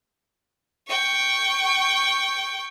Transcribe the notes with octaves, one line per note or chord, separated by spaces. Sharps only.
G5 C#6